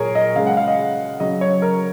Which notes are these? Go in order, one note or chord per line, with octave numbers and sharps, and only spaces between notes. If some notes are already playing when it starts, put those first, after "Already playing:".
Already playing: A#2 G#4 A#4 C#5
D#5
C#3 G#3 F5
F#5
F5
D#5
C#3 F#3 D#5
C#5
A#4